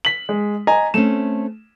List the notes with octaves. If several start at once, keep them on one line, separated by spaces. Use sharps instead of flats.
B6 F#7
G#3
D#5 G#5 A#5
A3 C4 C#4 E7